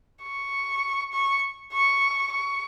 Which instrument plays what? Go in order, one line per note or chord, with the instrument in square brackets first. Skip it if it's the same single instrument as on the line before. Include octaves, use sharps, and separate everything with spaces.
[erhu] C#6
C#6
C#6
C#6